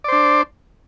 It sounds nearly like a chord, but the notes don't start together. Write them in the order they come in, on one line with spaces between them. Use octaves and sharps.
D5 C5 D4